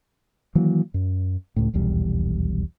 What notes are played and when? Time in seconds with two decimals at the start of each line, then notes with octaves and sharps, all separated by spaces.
0.55 D#3 E3 F#3 A#3
0.94 F#2
1.56 C#2 A2
1.74 D#1 B1 E2 G3